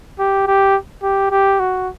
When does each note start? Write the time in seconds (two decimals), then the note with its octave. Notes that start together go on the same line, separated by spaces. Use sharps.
0.19 G4
0.47 G4
1.03 G4
1.31 G4
1.60 F#4